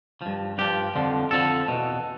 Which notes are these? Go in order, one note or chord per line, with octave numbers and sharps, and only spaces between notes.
G2 F3
G2 F3 G4
F2 D3 F3
F2 D3 F3 A4
E2 B2